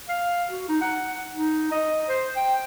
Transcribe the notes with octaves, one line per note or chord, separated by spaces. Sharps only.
F5
F#4
D#4
F#5
D#4
D#5
C5
G5